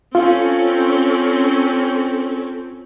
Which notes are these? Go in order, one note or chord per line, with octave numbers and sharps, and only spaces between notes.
C4 C#4 F4 A4